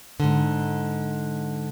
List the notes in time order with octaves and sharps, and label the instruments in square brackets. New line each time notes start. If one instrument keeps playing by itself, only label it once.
[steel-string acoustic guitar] G#2 D3